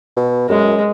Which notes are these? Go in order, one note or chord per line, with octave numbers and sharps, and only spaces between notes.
B2
F#2 G#3